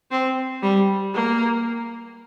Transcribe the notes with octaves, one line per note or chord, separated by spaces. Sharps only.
C4
G3
A#3